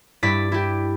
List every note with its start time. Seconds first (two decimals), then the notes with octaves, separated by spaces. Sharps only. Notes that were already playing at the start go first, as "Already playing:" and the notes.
0.23 G2 E4 D5 B6
0.52 E4 G4